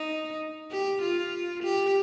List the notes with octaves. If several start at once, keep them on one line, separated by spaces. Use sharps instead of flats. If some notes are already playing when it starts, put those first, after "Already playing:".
Already playing: D#4
G4
F4
G4